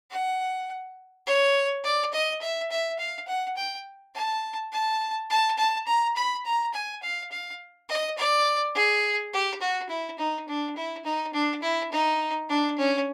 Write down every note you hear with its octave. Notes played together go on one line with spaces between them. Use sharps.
F#5
C#5
D5
D#5
E5
E5
F5
F#5
G5
A5
A5
A5
A5
A#5
B5
A#5
G#5
F5
F5
D#5
D5
G#4
G4
F#4
E4
D#4
D4
E4
D#4
D4
E4
D#4
D4
C#4